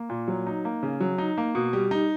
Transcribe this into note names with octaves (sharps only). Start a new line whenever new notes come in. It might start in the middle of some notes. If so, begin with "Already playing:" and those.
Already playing: A#3
A#2
F#3
D#4
A#3
C#3
F#3
D#4
A#3
B2
G3
D#4